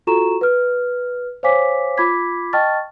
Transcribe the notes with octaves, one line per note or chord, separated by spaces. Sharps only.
F4 F#4 A4 A#5 C#6 E7
B4 F6
C5 C#5 F5 G#5 D6 B6
F4 B5 D6 G#6 B6
D#5 G5 A5 C#6 F6 A6